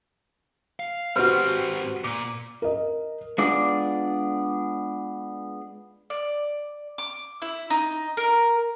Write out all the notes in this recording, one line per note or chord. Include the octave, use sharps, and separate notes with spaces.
F5
G#2 C4 F#4 G4 B4 C5 F6
A#2 D6
A#4 D#5
G#3 B3 D4 F4 D5
D5
D6
E4
D#4
A#4